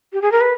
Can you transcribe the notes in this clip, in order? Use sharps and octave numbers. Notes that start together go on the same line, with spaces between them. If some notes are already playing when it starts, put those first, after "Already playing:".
G4
G#4
A#4
B4